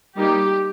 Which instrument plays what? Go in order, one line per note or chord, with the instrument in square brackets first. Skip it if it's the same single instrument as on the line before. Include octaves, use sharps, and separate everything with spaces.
[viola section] G3 A#3 D#4 G4